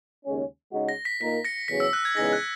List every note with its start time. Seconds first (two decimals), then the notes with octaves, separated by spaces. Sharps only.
0.25 D#2 C#3 G#3 C#4
0.72 C#3 G#3 D#4 F#4
0.89 A#6
1.05 B6
1.20 A#2 A#3 D#4 A#4 B6
1.45 A#6 C#7
1.68 E2 C#3 F#3 C#4 B6
1.80 E6
1.93 F#6
2.05 G#6
2.16 E2 C#3 G#3 D#4 G#4 A#6
2.33 F#6